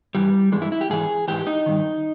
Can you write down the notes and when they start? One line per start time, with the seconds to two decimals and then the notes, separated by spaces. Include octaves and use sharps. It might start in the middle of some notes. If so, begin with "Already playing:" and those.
0.15 G2 E3 G3
0.52 G2 E3 G#3
0.62 E4
0.72 E4
0.81 G4
0.90 G#2 E3 G#4
1.28 G#2 E3 G4
1.47 D#4
1.66 G2 D#3